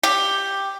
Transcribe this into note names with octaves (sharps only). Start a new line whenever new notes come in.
G4